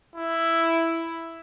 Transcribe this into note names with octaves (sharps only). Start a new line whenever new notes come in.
E4